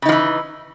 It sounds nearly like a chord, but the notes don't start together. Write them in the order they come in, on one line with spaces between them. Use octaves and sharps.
C#3 D#4 F3 E3